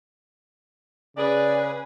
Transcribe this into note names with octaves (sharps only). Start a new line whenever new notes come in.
C#3 G#4 B4 D5 G#5